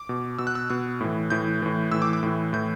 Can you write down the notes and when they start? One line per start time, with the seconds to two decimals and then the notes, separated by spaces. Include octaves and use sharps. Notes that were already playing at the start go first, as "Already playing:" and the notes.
Already playing: D6
0.09 B2
0.38 B2 E6
0.47 F#6
0.55 E6
0.70 B2 F#6
1.01 A2 E3
1.30 A2 E3 G6
1.62 A2 E3
1.91 A2 E3 E6
2.02 D6
2.13 D6
2.23 A2 E3
2.53 A2 E3 G6